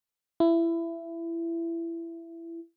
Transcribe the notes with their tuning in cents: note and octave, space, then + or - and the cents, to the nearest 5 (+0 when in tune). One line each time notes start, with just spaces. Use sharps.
E4 +20